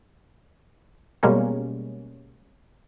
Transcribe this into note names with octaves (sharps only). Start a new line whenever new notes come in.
B2 G3 G#3 A#3 C#4